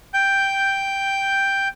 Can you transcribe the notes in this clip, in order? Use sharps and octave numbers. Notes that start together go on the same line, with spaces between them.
G5 G6